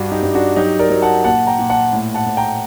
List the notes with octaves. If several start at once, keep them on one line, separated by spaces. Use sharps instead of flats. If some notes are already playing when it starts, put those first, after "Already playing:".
Already playing: G2 D4 F#4
D#4 G4
G2
D4 F#4
F#3 D#4 G4
A#4 D5
F#3
F#5 A5
A#2 F#5 A5
G5 A#5
A#2
F#5 A5
A2
F#5 A5
A2
G5 A#5